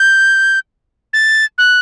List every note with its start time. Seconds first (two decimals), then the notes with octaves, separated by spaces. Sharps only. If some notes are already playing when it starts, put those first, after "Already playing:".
Already playing: G6
1.13 A6
1.58 F#6